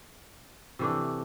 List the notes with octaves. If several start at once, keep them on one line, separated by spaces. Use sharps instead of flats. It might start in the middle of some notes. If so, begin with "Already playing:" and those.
C3 E3 A3 D4